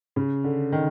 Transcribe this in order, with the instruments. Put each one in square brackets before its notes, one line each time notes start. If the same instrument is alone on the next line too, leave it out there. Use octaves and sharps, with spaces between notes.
[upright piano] C#3
D3
D#3